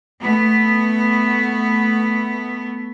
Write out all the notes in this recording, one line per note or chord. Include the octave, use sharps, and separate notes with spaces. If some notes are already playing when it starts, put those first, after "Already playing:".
A3 B3